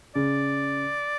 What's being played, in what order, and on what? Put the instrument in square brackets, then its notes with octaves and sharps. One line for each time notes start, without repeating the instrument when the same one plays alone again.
[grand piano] C#3 [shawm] D5